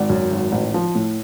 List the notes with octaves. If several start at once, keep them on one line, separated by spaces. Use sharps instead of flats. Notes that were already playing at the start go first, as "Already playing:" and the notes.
Already playing: G#1 D5 F#5
F#2
G#1
A1
F3
A2